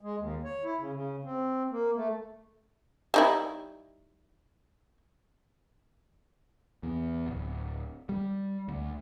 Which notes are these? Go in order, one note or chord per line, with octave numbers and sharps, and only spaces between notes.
G#3
D#2
C#5
E4
C#3
C#3
C4
A#3
A3
G3 D#4 E4
E2
D1
G3
D2